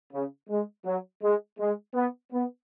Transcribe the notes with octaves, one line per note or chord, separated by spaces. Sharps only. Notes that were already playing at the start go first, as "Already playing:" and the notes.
C#3
G#3
F#3
G#3
G#3
B3
B3